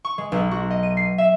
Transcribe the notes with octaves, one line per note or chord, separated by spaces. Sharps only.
C#6
G#3
B1
F#4
D#5
D#7
C7
E5